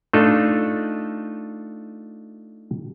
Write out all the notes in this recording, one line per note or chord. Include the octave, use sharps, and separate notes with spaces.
A3 D4 D#4 F4 A4